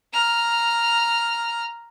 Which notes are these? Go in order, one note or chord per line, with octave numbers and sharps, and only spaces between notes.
A#5 F6